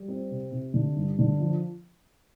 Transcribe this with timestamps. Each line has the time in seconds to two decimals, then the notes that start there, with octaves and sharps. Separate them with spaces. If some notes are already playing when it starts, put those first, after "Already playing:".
Already playing: G3
0.08 C4
0.30 C3
0.52 C3
0.74 D3
0.96 G2
1.18 D3
1.39 F3